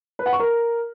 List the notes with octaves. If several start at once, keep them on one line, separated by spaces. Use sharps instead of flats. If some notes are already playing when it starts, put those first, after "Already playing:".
B4
F#5
C#6
A#4